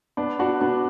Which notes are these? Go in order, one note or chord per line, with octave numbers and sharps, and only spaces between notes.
B3 D4
D4 F#4
B3 D4